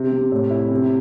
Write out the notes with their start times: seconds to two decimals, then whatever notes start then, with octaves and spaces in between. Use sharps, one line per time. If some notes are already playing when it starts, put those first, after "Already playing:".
Already playing: C3
0.11 C3
0.32 A2
0.51 E4
0.71 C3